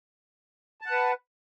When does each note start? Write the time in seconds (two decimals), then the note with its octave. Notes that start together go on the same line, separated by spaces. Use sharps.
0.81 A5
0.86 F#5
0.91 B4